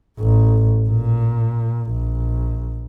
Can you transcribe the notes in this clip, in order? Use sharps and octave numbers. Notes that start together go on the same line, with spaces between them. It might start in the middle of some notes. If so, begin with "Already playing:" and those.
A1
A#2
A#1